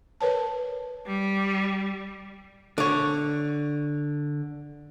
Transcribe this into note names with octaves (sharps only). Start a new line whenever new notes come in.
A#4 B4 C#5 A5
G3
D3 C#5